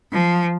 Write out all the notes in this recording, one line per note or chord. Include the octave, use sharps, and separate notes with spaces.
F3